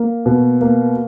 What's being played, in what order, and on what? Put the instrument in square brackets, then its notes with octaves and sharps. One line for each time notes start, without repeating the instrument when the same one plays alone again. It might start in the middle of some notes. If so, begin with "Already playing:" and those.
Already playing: [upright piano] A#3
B2
A#3